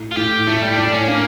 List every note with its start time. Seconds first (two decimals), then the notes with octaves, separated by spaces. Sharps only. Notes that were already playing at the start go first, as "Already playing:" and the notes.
Already playing: A2
0.12 F4
0.16 A2 G4
0.47 A2 A3
0.62 G3
0.77 A2 D4
0.93 C#4
1.07 A#3 D4